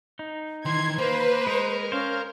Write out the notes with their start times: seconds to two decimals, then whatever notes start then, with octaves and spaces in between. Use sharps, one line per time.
0.19 D#4
0.65 D#3 E3 C6 G#6
0.98 A#3 B4 C5
1.47 G#3 A#4
1.92 C#4 C5 F5